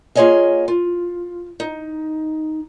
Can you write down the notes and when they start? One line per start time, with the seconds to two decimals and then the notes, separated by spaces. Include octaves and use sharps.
0.15 A#3 F4 G#4 C#5 D#5 G#5
0.68 F4
1.60 D#4